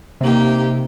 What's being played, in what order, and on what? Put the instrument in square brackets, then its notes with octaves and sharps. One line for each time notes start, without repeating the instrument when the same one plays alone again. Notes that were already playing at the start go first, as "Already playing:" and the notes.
[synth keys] C3 [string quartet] A#3 D#4 G4